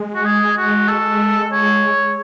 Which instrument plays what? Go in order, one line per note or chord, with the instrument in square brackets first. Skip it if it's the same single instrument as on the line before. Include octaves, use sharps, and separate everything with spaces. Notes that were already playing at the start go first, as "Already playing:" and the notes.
Already playing: [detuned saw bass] G#3
[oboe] F#4
G#4
F#4
A4
C#5